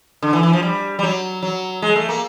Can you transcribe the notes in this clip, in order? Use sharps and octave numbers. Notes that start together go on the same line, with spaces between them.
D3
E3
E3
F3
G3
G3
F#3
F#3
G#3
A3
A#3